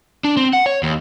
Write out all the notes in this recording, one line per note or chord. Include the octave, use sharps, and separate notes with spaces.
D4
C4
F#5
C#5
D#2